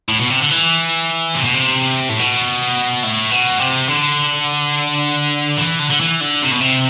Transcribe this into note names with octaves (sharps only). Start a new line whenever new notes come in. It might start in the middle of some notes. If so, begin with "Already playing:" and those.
A2
B2
C3
D3
E3
C3
B2
C3
A2
B2
A2
B2
C3
D3
E3
D3
D3
E3
D3
C3
B2
C3